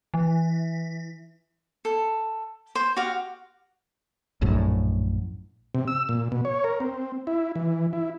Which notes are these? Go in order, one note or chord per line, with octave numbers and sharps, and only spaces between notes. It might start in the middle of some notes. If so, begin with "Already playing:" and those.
E3
A4
C5
F#4 G4 F5
A#1 F#2 A2
C3
E6
A#2
B2
C#5
A#4
C4
E4
E3
E4